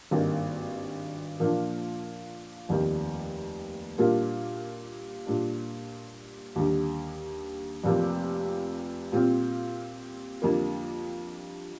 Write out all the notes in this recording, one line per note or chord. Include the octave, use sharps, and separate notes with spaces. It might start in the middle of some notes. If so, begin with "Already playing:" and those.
G#1 G2 D#3 A#3
A#2 F3 A#3 D4 F4
F1 D#2 D#3 G3
A#2 G3 A#3 D4 F4
A#2 G3 D4
D#2 D3 G3
F1 F2 C3 F3 A#3
A#2 G3 C4 F4
F2 D3 G3 A#3